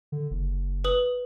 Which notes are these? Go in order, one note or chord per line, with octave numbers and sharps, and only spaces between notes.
D3
F#1
B4 D#6 F#7